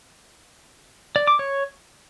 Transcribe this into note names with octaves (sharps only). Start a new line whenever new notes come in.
D5
D6
C#5